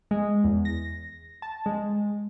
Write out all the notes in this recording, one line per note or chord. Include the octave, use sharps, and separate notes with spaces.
G#3
E2
A#6
A5
G#3